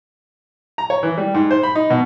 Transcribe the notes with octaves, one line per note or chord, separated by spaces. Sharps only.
A#5
C#5
E3
G3
G#2
C5
B5
D#4
B2